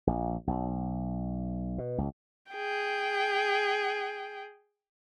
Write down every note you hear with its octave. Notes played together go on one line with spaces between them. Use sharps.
A#1
B1
B2
C#2
G#4 G5